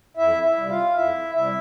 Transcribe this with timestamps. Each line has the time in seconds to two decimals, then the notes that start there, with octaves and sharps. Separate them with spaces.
0.17 F2 E4 E5
0.43 E4 E5
0.57 C3 G3
0.69 F4 F5
0.95 F2 E4 E5
1.35 C3 G3 E4 E5